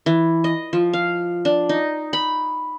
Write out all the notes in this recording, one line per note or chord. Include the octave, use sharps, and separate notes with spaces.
E3
D#5
F3
F5
D4
D#4
B5